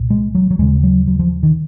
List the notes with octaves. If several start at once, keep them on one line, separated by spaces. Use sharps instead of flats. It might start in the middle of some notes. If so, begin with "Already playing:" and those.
Already playing: C2 A#2
G#3
F#3
F#3
D#2 C#3 G#3
F#3
F#3
F3
D#3